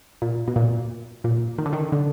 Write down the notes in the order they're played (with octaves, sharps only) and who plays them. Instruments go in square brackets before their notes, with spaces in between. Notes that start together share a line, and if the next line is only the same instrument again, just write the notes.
[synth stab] A#2
B2
A#2
A#2
D#3
D3
D#3
D3